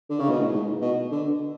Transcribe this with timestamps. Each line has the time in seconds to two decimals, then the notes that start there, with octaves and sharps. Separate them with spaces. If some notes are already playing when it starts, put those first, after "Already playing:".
0.10 D3
0.19 C#3
0.29 B2
0.40 A2
0.50 G#2
0.81 B2
1.12 D3